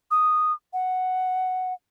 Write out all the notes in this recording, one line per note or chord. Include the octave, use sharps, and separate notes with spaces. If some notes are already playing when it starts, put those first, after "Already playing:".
D#6
F#5